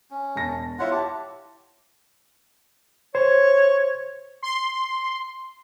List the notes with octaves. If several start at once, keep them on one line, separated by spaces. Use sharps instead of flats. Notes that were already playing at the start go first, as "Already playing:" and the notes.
C#4
E1 A5 A#6
E4 F4 C#5 E5 F#5
G4 A5
C5 C#5
C6